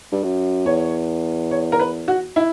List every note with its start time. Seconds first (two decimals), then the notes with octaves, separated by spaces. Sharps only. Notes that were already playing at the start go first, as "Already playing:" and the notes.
0.12 G2
0.23 F#2
0.66 E2 C#5
1.51 C#5
1.72 A#4
1.79 B4
2.08 F#4
2.36 E4